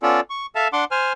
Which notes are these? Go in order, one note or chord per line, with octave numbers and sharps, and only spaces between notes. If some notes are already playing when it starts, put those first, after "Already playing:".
B3 C#4 F4 A4 D5
C#6
A4 E5 F5 A5
D4 F#5 C6 D6
C5 G#5 F6